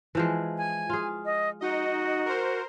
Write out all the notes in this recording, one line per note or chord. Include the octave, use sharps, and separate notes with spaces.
E3 F3 G#3
G#5
F4 G#4
D#5
D#4 F#4 D#5
A#4 C5